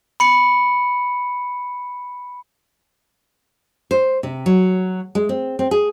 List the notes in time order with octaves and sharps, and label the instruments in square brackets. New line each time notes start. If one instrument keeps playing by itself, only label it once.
[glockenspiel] B5 C#7
[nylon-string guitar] C5
C3
F#3
G#3
C4
C4
G#4